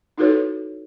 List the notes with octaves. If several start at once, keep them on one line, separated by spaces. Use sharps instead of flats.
D#4 E4 F#4 A4 B4 C#5